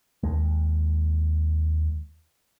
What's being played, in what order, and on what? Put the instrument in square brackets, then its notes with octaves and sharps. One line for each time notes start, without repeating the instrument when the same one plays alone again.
[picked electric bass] D#2 G#3